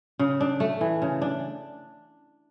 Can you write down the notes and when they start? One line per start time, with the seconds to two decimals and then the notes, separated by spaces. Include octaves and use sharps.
0.19 C#3
0.40 D4
0.60 A3
0.81 E3
1.02 C#3
1.22 D4